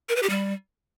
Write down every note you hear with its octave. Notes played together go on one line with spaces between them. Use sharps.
A#4
B4
G4
G3